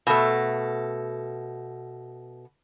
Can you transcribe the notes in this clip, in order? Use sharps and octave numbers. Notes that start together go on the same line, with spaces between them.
B2 A3